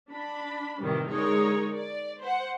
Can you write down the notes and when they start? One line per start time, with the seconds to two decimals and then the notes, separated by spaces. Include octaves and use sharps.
0.12 D4 B5
0.82 A2 C3 D#3 E3 G3
1.12 D3 G#3 D#4 G#4 A#4 C#5
1.77 D5
2.23 C5 F#5